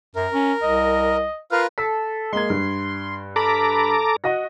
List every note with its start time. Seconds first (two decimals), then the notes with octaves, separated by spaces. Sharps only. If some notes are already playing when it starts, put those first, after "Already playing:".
0.15 F#2 A#4
0.34 C#4
0.63 C2 D#5
1.52 F4 A#4 B4 F5
1.78 A4 B6
2.33 G#3 A#3 C6 G#6
2.50 G2
3.36 A4 A#5 B5 D6
4.24 F#4 D#5 F#5 A#6